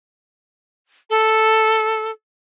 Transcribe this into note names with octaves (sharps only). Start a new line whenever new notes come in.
A4